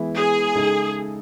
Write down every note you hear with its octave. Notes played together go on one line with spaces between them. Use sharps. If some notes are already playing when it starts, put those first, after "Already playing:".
Already playing: E3 G#3 B3 E4
G#4
C#3 G#3 D#4 A4